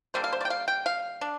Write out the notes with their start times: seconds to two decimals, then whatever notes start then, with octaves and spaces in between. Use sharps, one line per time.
0.14 D3 G3 A#3 C5
0.24 F5
0.33 C5
0.41 D5
0.45 G5
0.50 F5
0.68 G5
0.86 F5
1.21 D4